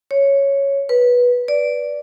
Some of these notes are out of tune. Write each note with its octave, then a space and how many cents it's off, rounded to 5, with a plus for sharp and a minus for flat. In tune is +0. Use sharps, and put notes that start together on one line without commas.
C#5 +0
B4 -15
D5 -10